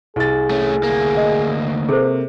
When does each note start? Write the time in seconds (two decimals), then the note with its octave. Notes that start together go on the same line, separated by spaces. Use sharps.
0.16 C2 G#4 A6
0.50 A3 C#4
0.83 D2 A#3
1.17 D#5
1.89 C3 A#3 G#4 A4 C5